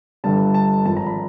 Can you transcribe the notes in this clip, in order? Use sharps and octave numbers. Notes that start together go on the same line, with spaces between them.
G1 G2 D3 G3 A5
A5
G#1 G#2 F3 A5
A#5
B5